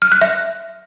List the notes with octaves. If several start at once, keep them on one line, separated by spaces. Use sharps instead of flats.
F6
F#6
E5